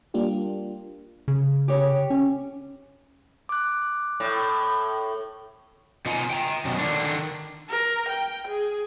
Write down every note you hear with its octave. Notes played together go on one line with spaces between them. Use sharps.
G3 A#3 D4 F4 G4
C#3
G4 C#5
C#4
D6 F#6
A2
B2 D#4 F4 F#5 G#5 A#5
G5 A#5
F#2 B2
D3 D#3 D4
A#4
G5
G#4